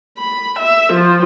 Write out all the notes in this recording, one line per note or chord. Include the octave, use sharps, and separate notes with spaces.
B5
E5
F3